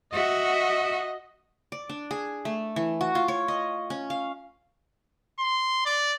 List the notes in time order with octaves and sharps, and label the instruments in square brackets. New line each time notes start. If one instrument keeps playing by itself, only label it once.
[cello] F#4 E5 [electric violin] D#5
[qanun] D5
D4
G#4
A3
E3
F#4
F4
C#5
D#5
C#4
F5
[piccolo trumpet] C6
D5